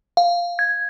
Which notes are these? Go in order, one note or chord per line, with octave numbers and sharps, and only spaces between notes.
F5
G#6